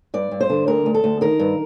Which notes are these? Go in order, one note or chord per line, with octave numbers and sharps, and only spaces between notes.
G2 D5
G2
C5
D3
D2 A#4
D2
A4
D2
D#3 A#4
G2